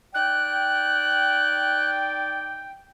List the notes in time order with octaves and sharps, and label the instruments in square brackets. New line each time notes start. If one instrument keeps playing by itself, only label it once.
[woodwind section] D#4 D5 G5 [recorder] F#6